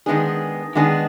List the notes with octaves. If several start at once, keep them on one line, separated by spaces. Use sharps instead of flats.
D#3 G#3 B3 D4 G#4
D#3 G#3 B3 D4 G#4